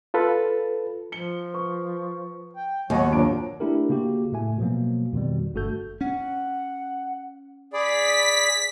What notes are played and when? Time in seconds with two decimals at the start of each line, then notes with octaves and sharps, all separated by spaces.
0.14 F4 A4 B4
1.12 F3 C#7 G7
1.54 B4 C#6
2.56 G5
2.90 D#2 F#3 B3 C#5 D#5 F#5
3.11 G1 A#2 F3 F#3 D4 A#5 D7
3.60 A3 D4 E4 G4 A#4
3.89 C#3 A#3 F#4 G4
4.32 A2 A3 G#5
4.58 B2 F3 F#3 A#3
5.13 F2 B2 D#3 G3
5.54 G1 G2 A3 F#4 A4 G6
6.01 C#4 F#5
7.73 G#4 D5 B5 B6